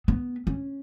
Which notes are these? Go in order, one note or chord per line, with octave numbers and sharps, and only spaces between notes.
B3
C#4